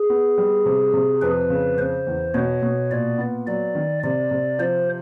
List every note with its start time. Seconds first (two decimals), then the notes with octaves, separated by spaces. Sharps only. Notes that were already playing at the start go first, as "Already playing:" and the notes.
Already playing: G#4
0.10 B3
0.38 G3
0.66 C3
0.93 C3
1.22 F2 B4
1.50 C#3
1.77 C#3 C5
2.07 E2
2.34 B2 C#5
2.62 B2
2.91 A#2 D5
3.18 B3
3.47 F#3 D5
3.75 D#3
4.03 C3 D5
4.31 C3
4.59 F3 C5